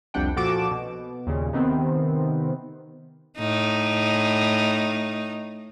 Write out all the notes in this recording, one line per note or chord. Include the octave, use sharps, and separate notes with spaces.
C2 F2 G3 D4 F#5 G5
A#2 F3 F#4 A4 D6 E7
B2
D#2 A#2 C#3
C3 D#3 B3 C4
A2 D#4